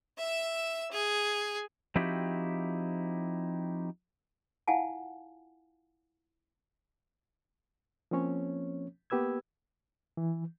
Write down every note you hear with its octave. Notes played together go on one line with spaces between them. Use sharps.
E5 E6
G#4
F3 C4 D#4 E4 F#4 G4
E4 F4 F5 F#5 G#5 A5
F3 A#3 C4 C#4 C#5
A#3 B3 G4 B4 E6 G#6
E3